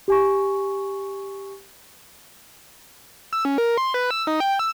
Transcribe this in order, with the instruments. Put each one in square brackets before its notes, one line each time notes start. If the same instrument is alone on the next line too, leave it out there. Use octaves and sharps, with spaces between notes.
[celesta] G4 G#5 C#6
[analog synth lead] E6
C#4
A#4
C6
B4
E6
D#4
G5
E6